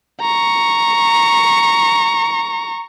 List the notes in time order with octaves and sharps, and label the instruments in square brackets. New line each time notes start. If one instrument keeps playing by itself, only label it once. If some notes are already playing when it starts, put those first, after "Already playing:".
[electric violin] A#5 C#6